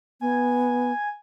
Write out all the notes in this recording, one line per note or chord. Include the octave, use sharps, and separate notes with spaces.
B3 G#5